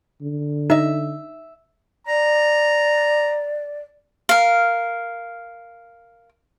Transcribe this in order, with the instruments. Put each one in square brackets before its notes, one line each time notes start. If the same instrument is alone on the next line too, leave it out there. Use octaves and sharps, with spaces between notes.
[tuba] D3
[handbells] D#4 D#5 [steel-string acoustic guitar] E5
[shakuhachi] D5 [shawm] A#5
[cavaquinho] A#4 F5